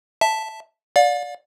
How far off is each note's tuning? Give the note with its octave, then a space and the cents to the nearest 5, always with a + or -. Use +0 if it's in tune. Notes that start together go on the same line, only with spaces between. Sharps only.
E5 +0 A5 +0
D5 -10 F5 +40